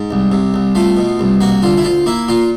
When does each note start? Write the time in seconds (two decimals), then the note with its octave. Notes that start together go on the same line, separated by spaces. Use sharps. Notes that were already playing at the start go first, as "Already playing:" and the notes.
Already playing: G#2
0.11 C2
0.32 C3
0.54 C2
0.75 A3 F4
0.97 B2
1.19 C2
1.41 A#3 F#4
1.62 D3 F4
1.78 E4
1.84 D2 F4
2.06 A#3 E4
2.29 A#2 F4